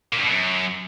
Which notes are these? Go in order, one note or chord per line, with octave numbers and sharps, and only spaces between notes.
A#2
G2
B2
F#2